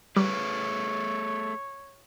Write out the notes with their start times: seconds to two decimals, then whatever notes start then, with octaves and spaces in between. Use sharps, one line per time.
0.16 G3 A3 G#4 B4 C#5